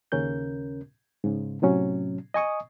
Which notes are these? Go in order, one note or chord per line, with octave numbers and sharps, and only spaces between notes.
D#2 C#3 C#4 A#4 G6
G#2 C#3
A2 C3 F#3 C#4
D#5 G#5 C#6 D#6